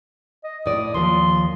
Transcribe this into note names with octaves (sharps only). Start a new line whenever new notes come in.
D#5
A2 D5 D#6
D#2 F3 C6